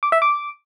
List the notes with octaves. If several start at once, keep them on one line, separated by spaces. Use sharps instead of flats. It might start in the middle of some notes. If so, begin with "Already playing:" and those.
D6
E5
D6